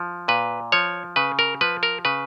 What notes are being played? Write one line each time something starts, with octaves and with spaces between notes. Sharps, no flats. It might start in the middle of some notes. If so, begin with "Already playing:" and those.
Already playing: F3
A#2 B4
F3 C#5
C#3 B4
A#4
F3 B4
A#4
C#3 B4